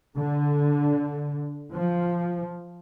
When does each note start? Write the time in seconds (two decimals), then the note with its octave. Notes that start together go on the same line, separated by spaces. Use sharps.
0.16 D3
1.74 F3